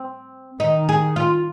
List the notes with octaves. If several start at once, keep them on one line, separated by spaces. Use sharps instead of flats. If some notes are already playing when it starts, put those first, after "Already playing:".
Already playing: C4
D#3 D#4
G#4
F4